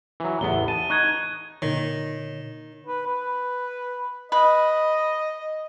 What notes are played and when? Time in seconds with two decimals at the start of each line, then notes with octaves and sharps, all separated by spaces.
0.20 E3 F#3
0.41 A1 E2 B3 G7
0.68 A5 D#7
0.90 D#4 C#6 F#6 G#6
1.62 A#2 D3 D#3 C#5
2.86 B4
3.06 B4
4.32 B4 D#5